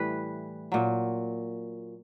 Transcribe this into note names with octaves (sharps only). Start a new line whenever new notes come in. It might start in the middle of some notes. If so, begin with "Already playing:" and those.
Already playing: A2 E3 G3 B4
A#2 F#3